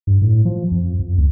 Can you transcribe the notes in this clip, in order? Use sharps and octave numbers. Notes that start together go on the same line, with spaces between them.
G2
A2
F3
F2
F2
D2